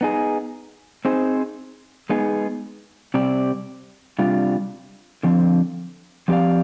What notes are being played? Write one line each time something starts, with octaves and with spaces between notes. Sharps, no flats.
B3 D#4 G#4
C4 D#4 G#4 C5
G#3 B3 D#4 G#4
C3 G3 C4 G4 D5
C3 G3 D4 F4
D3 F3 C4
F3 C4 G4 D5 F5